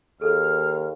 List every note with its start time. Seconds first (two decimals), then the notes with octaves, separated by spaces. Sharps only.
0.21 D#2 G#4 A4 F6